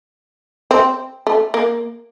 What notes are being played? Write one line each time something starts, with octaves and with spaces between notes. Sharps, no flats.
C4
A3
A#3